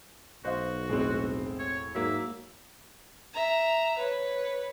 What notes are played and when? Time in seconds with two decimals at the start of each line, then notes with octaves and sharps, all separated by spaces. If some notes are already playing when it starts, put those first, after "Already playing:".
0.45 B1 F#4 C5 D#5 F5
0.89 E1 A2 G#3 C4
1.59 C#5
1.95 G#2 F#3 A#3 E5
3.34 E5 A#5
3.98 B4 C#5